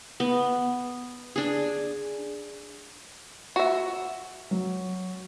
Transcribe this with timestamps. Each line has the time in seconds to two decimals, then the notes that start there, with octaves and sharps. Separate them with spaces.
0.20 B3
1.36 D4 G#4
3.56 F#4 E5
4.51 F#3